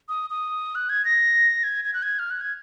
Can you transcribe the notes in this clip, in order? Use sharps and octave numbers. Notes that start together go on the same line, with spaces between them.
D#6
D#6
F#6
G#6
A#6
G#6
G#6
F#6
G#6
F6
F#6
G#6